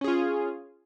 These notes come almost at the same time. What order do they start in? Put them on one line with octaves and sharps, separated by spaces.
C#4 G#4 F4